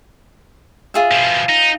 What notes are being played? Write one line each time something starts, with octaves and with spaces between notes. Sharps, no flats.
F4 G#4 E5
B2 F3
D#4